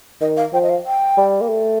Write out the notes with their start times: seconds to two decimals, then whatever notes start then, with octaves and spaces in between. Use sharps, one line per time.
0.21 D#3 D#5
0.37 F5
0.53 F3 G5
0.63 D#5
0.69 F5
0.86 G5
1.17 G3
1.41 A#3
1.49 A3